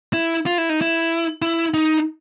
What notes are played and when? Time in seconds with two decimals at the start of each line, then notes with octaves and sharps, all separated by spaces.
0.13 E4
0.46 F4
0.58 E4
0.69 D#4
0.81 E4
1.42 E4
1.74 D#4